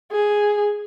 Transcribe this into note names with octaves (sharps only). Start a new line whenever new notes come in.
G#4